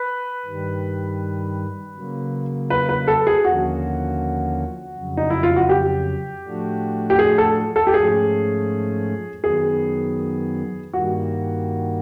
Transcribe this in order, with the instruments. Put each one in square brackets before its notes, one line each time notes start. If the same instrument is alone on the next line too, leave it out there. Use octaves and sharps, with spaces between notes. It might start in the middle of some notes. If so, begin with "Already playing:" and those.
Already playing: [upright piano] B4
[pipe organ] G2 D#3 G3
C#3 F#3 A#3
[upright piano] B4
B4
A4
G#4
[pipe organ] D#2 D3 F3 A#3 C#4 [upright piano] F#4
[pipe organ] F2 C#3 F#3
[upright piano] D#4
E4
F4
F#4
G4
[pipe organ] A2 F3 A3 D4 F#4
[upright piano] G4
G#4
A4
A4
G4
[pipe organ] G#2 F3 A3 C#4 [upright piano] G#4
[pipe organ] F#2 D#3 F#3 B3 [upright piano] G#4
[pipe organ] G2 D#3 G3 A#3 [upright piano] F#4